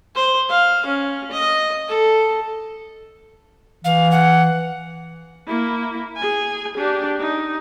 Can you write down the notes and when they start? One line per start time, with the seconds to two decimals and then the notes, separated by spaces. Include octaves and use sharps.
0.15 C5
0.49 F5
0.86 C#4
1.31 D#5
1.88 A4
3.84 E3 F5
4.11 F#5
5.47 A#3 E4
6.17 G#4 G#5
6.78 D4 G4
7.20 D#4